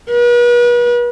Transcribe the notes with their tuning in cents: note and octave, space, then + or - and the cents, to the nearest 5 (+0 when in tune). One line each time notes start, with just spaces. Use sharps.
B4 -40